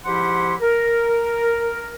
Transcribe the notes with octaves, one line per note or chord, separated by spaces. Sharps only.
G#2 F3 E4 G4 F#5 C6
A#4